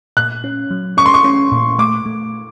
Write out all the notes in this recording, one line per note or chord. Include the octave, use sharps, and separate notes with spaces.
A#2 F#6
C#4
F#3
C#4 C#6
C6
C#6
C#4
A#2
A3 D6
A3